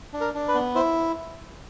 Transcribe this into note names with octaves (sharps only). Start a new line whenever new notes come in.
D4
A#4
D4
B4
B3
E4 C5